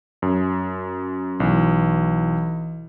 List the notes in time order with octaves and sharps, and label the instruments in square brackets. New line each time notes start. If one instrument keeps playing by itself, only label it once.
[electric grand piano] F#2
[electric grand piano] B1 [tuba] E3